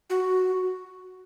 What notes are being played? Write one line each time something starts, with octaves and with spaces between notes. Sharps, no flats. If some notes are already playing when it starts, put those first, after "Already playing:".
F#4